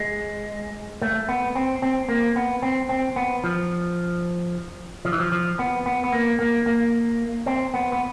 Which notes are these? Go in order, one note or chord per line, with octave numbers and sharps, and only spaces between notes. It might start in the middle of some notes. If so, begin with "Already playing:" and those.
Already playing: G#3
A3
B3
C4
C4
A#3
B3
C4
C4
B3
F3
F3
E3
F3
F3
B3
B3
B3
A#3
A#3
A#3
C4
B3
B3